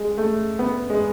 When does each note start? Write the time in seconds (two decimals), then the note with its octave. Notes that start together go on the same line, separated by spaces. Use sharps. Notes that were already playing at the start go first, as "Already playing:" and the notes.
Already playing: G#3
0.18 A3
0.59 B3
0.90 G#3